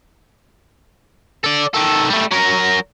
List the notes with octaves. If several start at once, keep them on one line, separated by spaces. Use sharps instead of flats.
A4 D5
D#3 A4
G3 A3
F#3 A#4